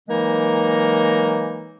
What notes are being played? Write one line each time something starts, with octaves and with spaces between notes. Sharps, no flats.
E3 F#3 G#3 A#3 D#4 A#4